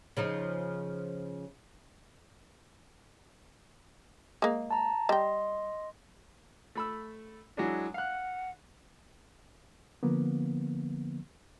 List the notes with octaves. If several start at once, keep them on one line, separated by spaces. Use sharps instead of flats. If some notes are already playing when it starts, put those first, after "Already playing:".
C#3 F3 D#4
G#3 A#3
A5 A#5
G3 D#5 G5 C6
A3 B5 E6
F#3 G#3 D4 E4
F5 F#5 F#6
D3 F3 A#3 B3